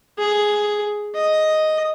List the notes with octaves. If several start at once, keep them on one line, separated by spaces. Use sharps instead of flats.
G#4
D#5